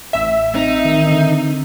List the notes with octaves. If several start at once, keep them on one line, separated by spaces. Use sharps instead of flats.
A1 E5
C4 D#4
D#3
D3 C4